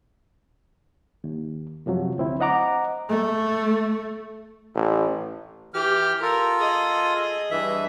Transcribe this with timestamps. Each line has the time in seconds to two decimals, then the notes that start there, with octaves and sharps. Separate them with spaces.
1.24 D#2
1.86 F#2 C3 F3 F#3
2.18 D2 C4 E4
2.40 C5 D#5 F#5 A#5 D6
3.09 A3
4.75 A1
5.74 E3 G4 F6
6.22 F4 A4 A#4
6.59 G#4 D#5
7.51 G2 E3 E5